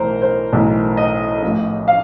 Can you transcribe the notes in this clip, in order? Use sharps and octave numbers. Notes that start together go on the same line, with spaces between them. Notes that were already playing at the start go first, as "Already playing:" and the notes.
Already playing: B1 A2 E3 A#4 C5
C5
B1 A2 E3
D#5
A1 A2 F3 D#5
F5